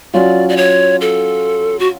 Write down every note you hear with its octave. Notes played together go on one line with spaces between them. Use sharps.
F#3 C#4 F4 D5
D5
C#5
A4
F#4